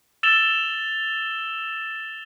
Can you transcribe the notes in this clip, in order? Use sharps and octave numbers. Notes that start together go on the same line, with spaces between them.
E6 A6 E7 F7 G7